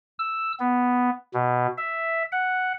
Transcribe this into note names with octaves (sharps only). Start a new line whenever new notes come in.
E6
B3
B2
E5
F#5